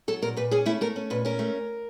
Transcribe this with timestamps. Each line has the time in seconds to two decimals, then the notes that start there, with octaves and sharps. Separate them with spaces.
0.08 F#3 A4
0.22 A#2 A#4
0.37 A#2 B4
0.51 C#4 G#4
0.66 A3 E4
0.81 A3 A#4
0.96 C#4
1.10 A#2 B4
1.25 C#4 A#4
1.39 A3